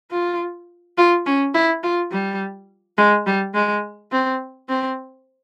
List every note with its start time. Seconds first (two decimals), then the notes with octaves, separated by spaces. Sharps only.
0.11 F4
0.98 F4
1.26 C#4
1.54 E4
1.83 F4
2.12 G3
2.98 G#3
3.27 G3
3.54 G#3
4.12 C4
4.69 C4